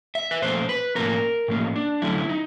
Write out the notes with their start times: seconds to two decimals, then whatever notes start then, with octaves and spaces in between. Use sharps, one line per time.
0.15 E5
0.31 B4
0.42 A#2 F3 A3 C#4 C5
0.69 B4
0.95 A2 F3 A#3 C#4 A#4
1.48 A2 F3 A#3 C#4
1.76 D4
2.02 D3 F#3 A3 C#4 E4
2.29 D#4